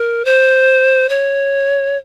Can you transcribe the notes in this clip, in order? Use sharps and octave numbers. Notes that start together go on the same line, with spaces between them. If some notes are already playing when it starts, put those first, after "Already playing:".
Already playing: A#4
C5
C#5